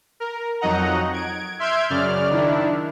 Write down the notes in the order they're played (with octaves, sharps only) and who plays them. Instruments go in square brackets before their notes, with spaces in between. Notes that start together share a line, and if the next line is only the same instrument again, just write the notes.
[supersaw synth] A#4
F2 F#3 D#4 D#5 F#5 A#5
G#6 D7
E5 C6 F6 G6 G#6 D7
F#2 C#3 D5 F6
D#3 D4 E4